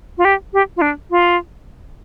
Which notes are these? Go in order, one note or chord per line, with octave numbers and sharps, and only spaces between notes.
F4
G4
G4
F4
D4
F4